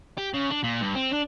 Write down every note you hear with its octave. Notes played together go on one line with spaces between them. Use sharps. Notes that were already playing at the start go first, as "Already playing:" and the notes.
G4
C#3
D4
A#2
G2
C4
D4